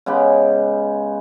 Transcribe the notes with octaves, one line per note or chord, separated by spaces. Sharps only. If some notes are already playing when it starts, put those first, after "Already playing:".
C#3 G#3 B3 G4